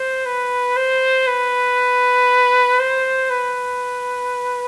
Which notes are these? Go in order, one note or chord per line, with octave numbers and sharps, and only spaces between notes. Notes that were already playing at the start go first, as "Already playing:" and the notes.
Already playing: C5
B4
C5
B4
C5
B4